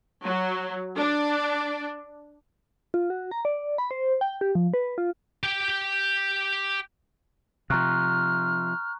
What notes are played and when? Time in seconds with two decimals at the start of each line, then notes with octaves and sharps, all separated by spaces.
0.25 F#3
0.98 D4
2.94 F4
3.10 F#4
3.31 A#5
3.45 D5
3.78 B5
3.91 C5
4.21 G5
4.41 G4
4.55 F3
4.74 B4
4.98 F4
5.43 G4 G5
7.70 C3 F3 A#5 C#6 F6 F#6